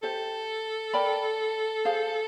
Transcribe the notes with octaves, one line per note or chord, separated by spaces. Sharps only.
G4 A4 C5 E5
A#4 D5 G5 B5
G#4 C5 F5